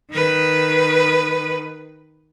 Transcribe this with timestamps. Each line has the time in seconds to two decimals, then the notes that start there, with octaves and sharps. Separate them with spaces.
0.11 D#3 B4